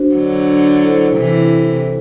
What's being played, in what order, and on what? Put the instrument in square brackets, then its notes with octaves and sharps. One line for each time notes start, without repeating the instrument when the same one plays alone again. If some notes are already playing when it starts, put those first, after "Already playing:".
Already playing: [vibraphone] D4 F#4 C5
[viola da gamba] D3 F#3
[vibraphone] E4 A4 C5
[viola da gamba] C3 E3